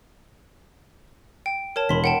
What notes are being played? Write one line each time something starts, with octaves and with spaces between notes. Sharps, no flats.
G5
A#4 C#5 A5
E1 B5 C6 B6
F#5 G5 A5